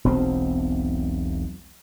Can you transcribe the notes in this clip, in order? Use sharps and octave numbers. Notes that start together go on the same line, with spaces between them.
E1 B1 C4